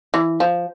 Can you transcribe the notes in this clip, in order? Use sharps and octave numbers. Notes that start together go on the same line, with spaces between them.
E3
F3